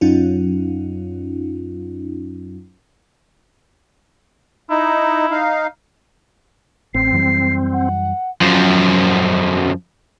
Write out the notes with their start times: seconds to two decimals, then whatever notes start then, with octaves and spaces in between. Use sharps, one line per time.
0.01 F#2 F#3 C#4 D#4 F4
4.70 D#4 E4
5.31 D#4 F5
6.95 A1 C4 C7
7.12 F#2 E3 G3
7.73 F#5
8.41 F#2 F3